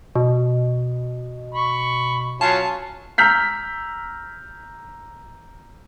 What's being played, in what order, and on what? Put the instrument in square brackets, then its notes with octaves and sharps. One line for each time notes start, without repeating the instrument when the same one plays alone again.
[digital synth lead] B2
[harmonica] B5 C#6
[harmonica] F#3 C#4 F4 [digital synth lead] A5
[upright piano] A#5 E6 F6 G6 B6